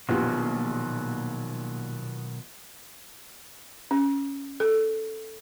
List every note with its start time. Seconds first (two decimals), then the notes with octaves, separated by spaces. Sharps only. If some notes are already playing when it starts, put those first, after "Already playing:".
0.09 A#1 B2 D#3 F#3 B3 F4 G4
3.91 C#4
4.60 A4